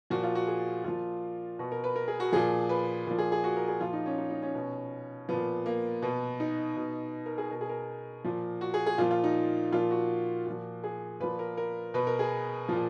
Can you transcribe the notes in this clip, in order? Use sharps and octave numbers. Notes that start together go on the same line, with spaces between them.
A#2 F3 F#4
F4
F#4
G#4
A#2 F3 F4
B2 F#4
A#4
B4
A#4
G#4
F#4
A#2 F3 G#4
B4
A#2 F3
G#4
G#4
F#4
A#4
G#4
A#2 F3 F4
D#4
C#4
D#4
D#4
C#4
B2
A#2 F3 B3
A#3
B2 B3
D#4
B2
A#4
G#4
B2 A#4
G#4
A#4
A#2 F3
F#4
G#4
G#4
A#2 F3 F4
F4
D#4
A#2 F3 F4
F#4
A#2 F3
G#4
A#2 F3 B4
A#4
A#4
B2 B4
A#4
G#4
A#2 F3